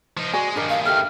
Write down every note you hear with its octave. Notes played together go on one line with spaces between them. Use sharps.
F3 D#4
G#3 F#4 D5 G#5
G2 D#3 D4 A#4 D#5
F5
G4 A4 E5 F6